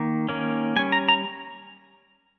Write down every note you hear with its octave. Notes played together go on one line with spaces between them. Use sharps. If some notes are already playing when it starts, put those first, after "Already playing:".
Already playing: D#3 A#3
D#3 A#3 C#4
G3 C#4 G#5
A#5
A#5